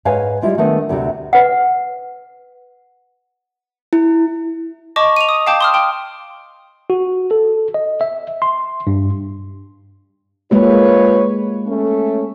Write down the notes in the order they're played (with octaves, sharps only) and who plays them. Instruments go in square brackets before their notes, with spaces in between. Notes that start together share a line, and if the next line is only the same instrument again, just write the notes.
[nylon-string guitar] G#2 B4 C#5 F5 G#5
G3 G#3 E4 F4
D#3 A3 B3 D4 D#5
D2 C3 D4 F#4
[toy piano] B4 F#5
[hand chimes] E4
[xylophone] D#5 A5 C#6 D6
D#7 F7
D#6
F5 G5 A5 D6 G6
C6 D#6 F6
G5 C6
[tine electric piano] F#4
A4
D#5
E5
C6
G2
[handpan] G#3 A#3 G4 [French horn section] F4 B4 C#5
[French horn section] A3 C#4